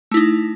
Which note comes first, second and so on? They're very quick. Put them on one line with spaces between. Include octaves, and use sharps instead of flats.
A3 E4 D#4